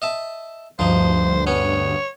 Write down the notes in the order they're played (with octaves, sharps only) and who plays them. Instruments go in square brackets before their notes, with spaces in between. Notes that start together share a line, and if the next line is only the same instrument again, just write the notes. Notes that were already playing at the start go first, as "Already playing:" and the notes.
[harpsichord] D#5 E5 A5
[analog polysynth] D2 G2 [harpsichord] F3 D#4 [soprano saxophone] C5
[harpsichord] B3 C#4 [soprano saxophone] C#5